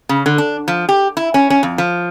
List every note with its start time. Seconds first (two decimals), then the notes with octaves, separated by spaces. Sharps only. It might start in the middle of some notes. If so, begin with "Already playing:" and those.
0.09 C#3
0.26 D3
0.38 D4
0.68 F3
0.89 G4
1.17 E4
1.34 C#4
1.50 C#4
1.63 F2
1.78 F3